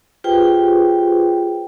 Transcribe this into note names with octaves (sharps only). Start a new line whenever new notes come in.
F4 G4 G#4 B4 C5 G5